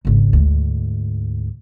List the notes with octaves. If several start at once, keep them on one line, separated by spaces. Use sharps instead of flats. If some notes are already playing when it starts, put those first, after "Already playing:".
G#1 C#2
D2 G#2